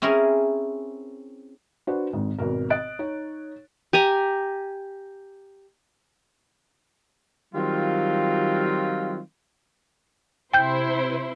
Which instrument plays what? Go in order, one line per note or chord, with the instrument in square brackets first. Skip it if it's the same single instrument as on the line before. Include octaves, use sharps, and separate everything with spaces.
[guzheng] C4 C#4 E4 G#4 A#4
[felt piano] D4 F#4 B4 C5
G#1 G#2
G#1 B2 A#4
D#5 F#6 A6 D7
D#4 C#5
[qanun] G4 G#5 A#5
[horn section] D#3 F#3 G3 C4 F4
[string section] C3 E4 C5 [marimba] G5 G6